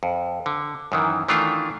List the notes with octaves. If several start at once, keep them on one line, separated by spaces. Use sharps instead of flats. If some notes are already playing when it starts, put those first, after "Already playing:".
F2
D3
F#2 D#3 E3
D#3 E3 A3 D4 F4